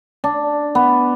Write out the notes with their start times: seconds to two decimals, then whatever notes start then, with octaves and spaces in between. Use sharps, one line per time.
0.24 D4
0.75 B3